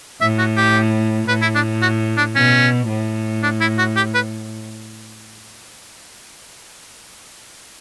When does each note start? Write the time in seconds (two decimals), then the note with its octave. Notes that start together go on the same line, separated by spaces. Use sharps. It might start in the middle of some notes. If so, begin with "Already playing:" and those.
0.21 A2 E5
0.39 F#4
0.57 G4
1.28 A2 B4
1.42 E4
1.55 D4
1.82 F#4
2.17 D4
2.35 B2 C#4
2.89 A2
3.43 D4
3.60 E4
3.78 F#4
3.96 G4
4.14 B4